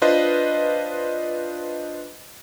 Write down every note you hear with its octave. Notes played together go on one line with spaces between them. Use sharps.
D4 F4 B4 C5 D#5